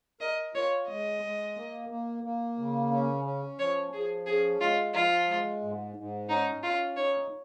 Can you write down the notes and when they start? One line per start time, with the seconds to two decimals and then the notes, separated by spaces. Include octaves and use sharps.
0.21 A#4 D#5
0.54 F4 C#5
0.89 G#3 D#5
1.23 G#3
1.56 A#3
1.89 A#3
2.24 A#3
2.58 C#3
2.91 C#4
3.25 C#4
3.59 F3 C#5
3.93 F3 G#4
4.26 C#4 G#4
4.60 G#3 F4
4.94 F3 F4
5.27 G#3
5.62 G#2
5.96 G#2
6.29 C#4 D#4
6.62 C#4 F4
6.97 D#4 C#5